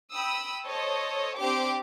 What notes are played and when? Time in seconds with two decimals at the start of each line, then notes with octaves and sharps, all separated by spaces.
0.12 G5 B5 D#6 E6
0.65 A4 C5 C#5 D#5
1.36 C4 D4 G4 D6